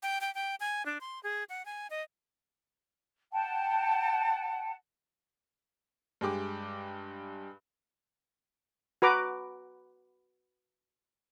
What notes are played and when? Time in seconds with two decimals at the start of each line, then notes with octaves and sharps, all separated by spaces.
0.03 G5
0.21 G5
0.35 G5
0.60 G#5
0.86 D4
1.01 C6
1.23 G#4
1.49 F#5
1.65 G#5
1.90 D#5
3.32 F#5 G5 A5
6.21 G2 G#3 G4 D6
9.02 F#4 B4 A#5 D6